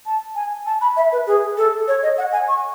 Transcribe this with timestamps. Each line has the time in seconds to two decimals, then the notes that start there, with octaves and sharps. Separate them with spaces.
0.06 A5
0.35 G#5
0.66 A5
0.81 B5
0.97 E5
1.12 B4
1.27 G#4
1.57 A4
1.88 C#5
2.03 D#5
2.18 F#5
2.32 G#5
2.48 C#6